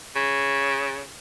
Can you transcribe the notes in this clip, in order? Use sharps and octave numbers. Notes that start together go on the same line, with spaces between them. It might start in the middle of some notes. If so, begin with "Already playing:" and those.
C#3